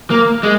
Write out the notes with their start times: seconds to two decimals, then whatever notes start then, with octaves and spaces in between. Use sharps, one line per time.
0.10 A#3
0.43 G#3